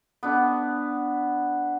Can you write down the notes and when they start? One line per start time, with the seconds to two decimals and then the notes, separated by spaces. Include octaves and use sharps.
0.23 B3 D4